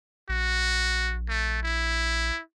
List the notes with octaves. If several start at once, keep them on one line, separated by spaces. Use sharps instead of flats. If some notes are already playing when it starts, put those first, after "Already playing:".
A#1 F#4
A3
E4